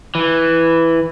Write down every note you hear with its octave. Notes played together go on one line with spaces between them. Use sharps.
E3